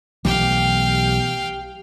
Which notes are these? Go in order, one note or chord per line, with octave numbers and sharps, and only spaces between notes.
B1 E3 A3 G4 F5 G5